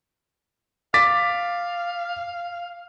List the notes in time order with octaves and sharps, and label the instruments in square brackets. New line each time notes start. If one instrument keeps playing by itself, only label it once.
[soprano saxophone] F5 [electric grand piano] D6 A6 B6